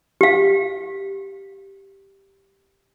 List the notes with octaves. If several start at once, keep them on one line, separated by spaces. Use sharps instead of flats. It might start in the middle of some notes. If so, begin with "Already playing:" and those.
G4 F5